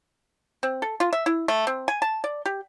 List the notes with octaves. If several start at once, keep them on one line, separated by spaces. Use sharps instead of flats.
C4
A4
F4
E5
E4
A3
C4
G#5
A5
D5
G4